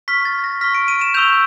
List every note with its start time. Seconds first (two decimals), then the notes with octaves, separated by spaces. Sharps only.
0.08 C#6 F6 B6
0.25 A6
0.44 A#6
0.61 C#6 F6 B6
0.74 D7
0.88 D#7
1.01 E7
1.14 C#6 E6 G6 F7